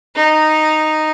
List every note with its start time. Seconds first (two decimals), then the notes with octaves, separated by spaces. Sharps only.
0.16 D#4